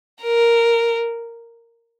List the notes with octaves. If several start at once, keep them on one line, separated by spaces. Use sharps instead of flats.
A#4